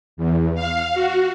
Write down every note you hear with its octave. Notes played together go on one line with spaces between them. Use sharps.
E2
F5
F#4